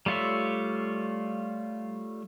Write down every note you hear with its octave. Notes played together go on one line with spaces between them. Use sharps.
G3 A3 F4 C#5 E5